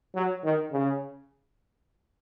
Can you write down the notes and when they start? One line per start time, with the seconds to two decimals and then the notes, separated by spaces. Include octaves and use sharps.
0.15 F#3
0.43 D#3
0.72 C#3